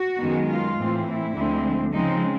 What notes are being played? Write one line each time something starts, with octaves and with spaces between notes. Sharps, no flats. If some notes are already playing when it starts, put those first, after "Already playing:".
Already playing: F#4
F#2 D#3 G#3 B3
F4
A2 E3 A3 C4
E4
D2 D3 F3 G#3 C4
C#3 F3 G#3 C4 D#4